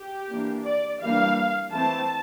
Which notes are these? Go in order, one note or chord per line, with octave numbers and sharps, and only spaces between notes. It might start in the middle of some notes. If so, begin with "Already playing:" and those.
Already playing: G4
E3 A#3 D4
D5
E3 G3 A#3 D4 F5
E3 A3 C4 A5